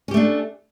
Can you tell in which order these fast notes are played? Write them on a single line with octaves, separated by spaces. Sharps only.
C#4 G4 A3 D4